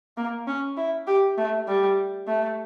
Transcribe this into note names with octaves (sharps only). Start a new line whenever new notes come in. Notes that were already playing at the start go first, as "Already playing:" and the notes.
A#3
C#4
E4
G4
A3
G3
A3